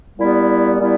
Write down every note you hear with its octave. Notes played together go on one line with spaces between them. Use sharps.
A#2 G3 B3 E4 G4
A#2 G3 B3 E4 G4